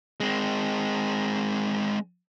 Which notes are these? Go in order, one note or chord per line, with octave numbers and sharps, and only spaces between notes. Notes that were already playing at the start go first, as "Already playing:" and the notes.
G#3 C4